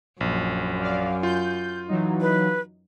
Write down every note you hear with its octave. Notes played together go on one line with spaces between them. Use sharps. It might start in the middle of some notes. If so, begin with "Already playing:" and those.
A#1 F#2
D5 F5
F4 G6
E3 F#3 D#4
B4